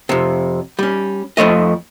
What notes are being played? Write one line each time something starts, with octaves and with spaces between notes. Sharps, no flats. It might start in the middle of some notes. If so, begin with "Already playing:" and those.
F2 C3
G3 C#4
F2 F3 A3 D#5